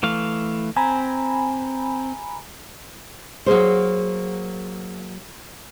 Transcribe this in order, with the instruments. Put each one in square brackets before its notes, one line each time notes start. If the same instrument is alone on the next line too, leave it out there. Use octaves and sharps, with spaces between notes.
[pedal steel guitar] E3 A3 F5
[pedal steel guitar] C4 [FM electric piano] G#5 A#5 B5
[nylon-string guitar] F#3 A#3 G#4 C5